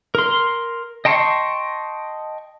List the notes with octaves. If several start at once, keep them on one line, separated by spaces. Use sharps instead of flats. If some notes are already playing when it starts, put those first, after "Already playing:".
A#4 C6
D#5 G5 A5 C6 C#6